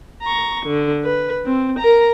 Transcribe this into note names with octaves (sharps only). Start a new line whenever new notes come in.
A#5 C#6
D3
B4
C4
A#4 A#5